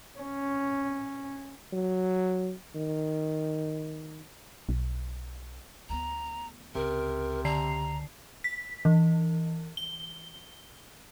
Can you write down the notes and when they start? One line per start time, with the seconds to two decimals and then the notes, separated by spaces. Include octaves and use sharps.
0.19 C#4
1.73 F#3
2.75 D#3
4.69 B1
5.89 D2 B3 A#5
6.75 C#2 C3 A#4
7.45 D3 A#5 C7
8.44 B6
8.85 E3
9.77 G7